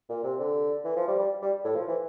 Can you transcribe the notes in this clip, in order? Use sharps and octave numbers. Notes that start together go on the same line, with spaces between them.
A#2
C3
D3
E3
F3
G3
G3
G3
A2
F3
E3